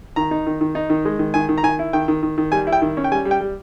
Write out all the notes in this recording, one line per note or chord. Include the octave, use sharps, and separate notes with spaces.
D#3 A#5
D#4
D#3
D#3
D#4
D#3
G#3
D#3
D#3 G#5
D#3
A#5
D#3 G#5
E4
D#3 G5
D#3
D#3
D#3
G3 G#5
E4
G5
D#3
C#4
G5
G3 G#5
G3
G5
G3